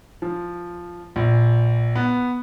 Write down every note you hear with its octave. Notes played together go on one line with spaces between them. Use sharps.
F3
A#1
B3